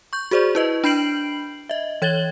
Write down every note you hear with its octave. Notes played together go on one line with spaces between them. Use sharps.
C#6 G6
F#4 G#4 C5 D5 C#6
E4 B4 D#5
D4 B5 G6 C7 D7 F#7
D#5 E5
E3 C#5 G#6 A6 F#7 G7